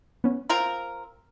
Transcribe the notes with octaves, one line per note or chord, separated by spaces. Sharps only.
B3 C#4
C4 F4 A#4 A#5